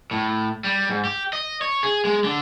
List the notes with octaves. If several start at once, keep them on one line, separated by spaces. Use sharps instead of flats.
A2
G3
G#2
G4
D#5
C#5
G#4
G#3
D3